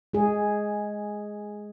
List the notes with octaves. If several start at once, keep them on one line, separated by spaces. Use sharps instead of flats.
G#3 G#4